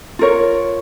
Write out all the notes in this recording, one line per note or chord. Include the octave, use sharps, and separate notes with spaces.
F4 A#4 C#5